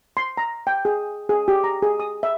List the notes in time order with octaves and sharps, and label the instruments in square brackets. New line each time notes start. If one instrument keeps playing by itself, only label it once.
[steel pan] C6
A#5
G5
G#4
G#4
G4
A#5
G#4
D#6
E5